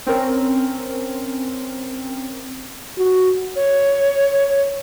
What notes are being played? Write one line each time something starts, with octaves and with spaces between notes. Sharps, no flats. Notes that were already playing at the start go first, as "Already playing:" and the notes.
C4 C#4 A#4
F#4
C#5